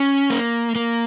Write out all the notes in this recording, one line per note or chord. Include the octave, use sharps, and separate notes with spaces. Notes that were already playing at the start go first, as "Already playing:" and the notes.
Already playing: C#4
A#3
A#3